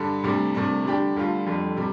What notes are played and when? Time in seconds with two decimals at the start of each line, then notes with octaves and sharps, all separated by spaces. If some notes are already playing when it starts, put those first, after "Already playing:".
Already playing: G2 D3 G3
0.24 D2 C3 G3 D4
0.55 C2 C3 A3 D4
0.85 D3 G3 D4 G4
1.16 D2 D3 G3 F4
1.46 F2 D3 G3
1.77 C3 G3